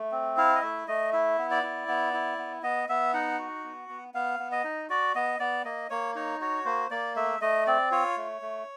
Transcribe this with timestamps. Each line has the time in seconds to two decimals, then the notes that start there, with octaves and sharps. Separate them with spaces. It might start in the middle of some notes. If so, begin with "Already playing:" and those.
Already playing: A3
0.12 C4
0.37 E4 F5
0.56 D#5
0.62 A3 E5
0.88 A3 D#5
1.13 E4 E5
1.38 B3
1.51 D5
1.63 E4
1.88 B3
2.13 E4
2.38 B3
2.63 B3 D#5
2.89 B3 E5
3.14 D#4 F#5
3.39 F#4
3.64 B3
3.89 B3
4.14 B3 F5
4.40 B3
4.52 D#5
4.64 D#4
4.90 F#4 D5
5.15 B3 D#5
5.39 B3 D5
5.65 A#3 D#5
5.90 A#3 C#5
6.15 D#4 C#5
6.41 F#4 C#5
6.65 A#3 C5
6.91 A#3 D5
7.16 A3 E5
7.41 A3 D#5
7.67 C4 D5
7.91 F4 C#5
8.17 A3
8.42 A3